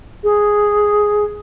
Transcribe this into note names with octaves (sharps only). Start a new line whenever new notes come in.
G#4